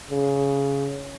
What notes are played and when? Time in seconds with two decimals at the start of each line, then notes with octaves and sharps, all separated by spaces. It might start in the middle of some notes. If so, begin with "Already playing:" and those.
0.11 C#3